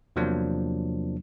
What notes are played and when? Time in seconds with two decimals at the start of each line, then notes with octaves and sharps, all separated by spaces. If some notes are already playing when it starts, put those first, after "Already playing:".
0.16 E2 C3 F3 F#3 A#3 D4